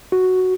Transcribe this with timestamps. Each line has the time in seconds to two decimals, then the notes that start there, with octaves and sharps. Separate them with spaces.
0.12 F#4